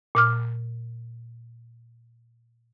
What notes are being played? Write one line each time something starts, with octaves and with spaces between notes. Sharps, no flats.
A#2 D6 F6